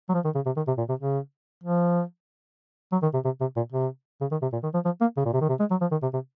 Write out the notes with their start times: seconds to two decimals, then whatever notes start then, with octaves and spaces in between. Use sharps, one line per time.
0.09 F#3
0.14 F3
0.25 D#3
0.35 C#3
0.46 C3
0.57 D#3
0.68 C3
0.78 A#2
0.89 C3
1.00 C#3
1.64 F3
2.92 F#3
3.03 D#3
3.14 C3
3.25 C3
3.41 C3
3.56 A#2
3.72 C3
4.21 C#3
4.32 D#3
4.42 C3
4.53 A#2
4.63 D#3
4.74 F3
4.85 F3
5.01 A#3
5.17 C#3
5.25 A#2
5.33 C3
5.41 D#3
5.49 C3
5.60 G#3
5.71 F#3
5.81 F3
5.92 D#3
6.03 C3
6.14 C3